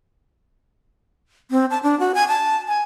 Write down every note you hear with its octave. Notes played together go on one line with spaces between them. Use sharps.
C4
A5
D4
F#4
G#5
A5
G#5